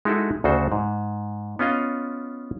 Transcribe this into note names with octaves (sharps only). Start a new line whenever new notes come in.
G#3 D#4 E4 F#4 A4
D2 C#3 F#4 A4 C5
G#2
B3 C#4 F4 D#5 F5